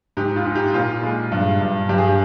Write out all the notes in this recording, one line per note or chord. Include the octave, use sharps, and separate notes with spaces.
G#2 G4
F4
G#2
G4
A#2 F4
G#3
G2
G2
G2 G4
G#4
G4